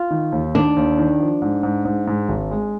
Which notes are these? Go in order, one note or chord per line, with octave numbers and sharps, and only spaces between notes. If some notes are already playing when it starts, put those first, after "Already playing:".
Already playing: F4
D#3
D#2
D#3 D4
D#2
D#3
F3
G#2
G#2
G#2
G#2
G#1
G#3